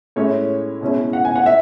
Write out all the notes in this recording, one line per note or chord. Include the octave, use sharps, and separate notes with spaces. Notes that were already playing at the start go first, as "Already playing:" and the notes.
A2 G#3 C#4 E4 C#5
B2 G#3 C#4 E4
F#5
G#5
F#5
E5